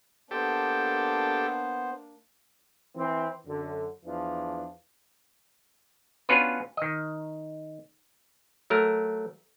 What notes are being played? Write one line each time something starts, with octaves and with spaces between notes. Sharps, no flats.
A#3 B3 D4 G4 A4 C5
E3 C4
F#2 D3
E2 E3 F3 D4
B3 C#4 D4 F4 F#4 B4
D#3 D#5
F#3 A3 A#4